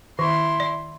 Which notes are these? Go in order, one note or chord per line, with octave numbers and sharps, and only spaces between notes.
D#3 E4 C6
D5